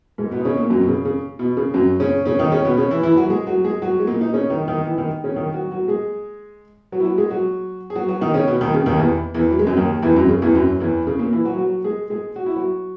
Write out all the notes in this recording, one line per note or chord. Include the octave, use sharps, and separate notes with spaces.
G#2 G#3
B2 B3
D#4
C#3 C#4
A#2 A#3
F#2 F#3
B2
C#3
C#3
B2
C#3
F#2 F#3
C#3 C#4
C#3 C#4
D#3 D#4
C#3 C#4
B2 B3
C#3 C#4
E3 E4
E3 E4
F#3 F#4
G#3 G#4
F#3 F#4
G#3 G#4
F#3 F#4
G#3
A#2 A#3
D#4
C#3 C#4
D#3 D#4
D#3 D#4
E3 E4
D#3 D#4
C#3 C#4
D#3 D#4
F#3 F#4
F#3 F#4
G#3 G#4
F#3 F#4
E4
F#3 F#4
G#3 G#4
F#3 F#4
G#4
F#3 F#4
F#3 F#4
D#3 D#4
C#3 C#4
B2 B3
D#2 D#3
C#3
D#2 D#3
E2 E3
E2 E3
F#3
G#3
F#2 F#3
D#2 D#3
E2 E3
F#2 F#3
C#3
E2 E3
F#2 F#3
E2 E3
C#3
A#2 A#3
E3 E4
F#3 F#4
F#3 F#4
G#3 G#4
G#3 G#4
F#4
E4
F#3 F#4